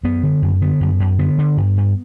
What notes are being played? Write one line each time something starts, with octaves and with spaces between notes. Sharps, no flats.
F#2 B3
D3
F#2
D3 B3
F#2
F#2
D3 B3
D3
G2
G2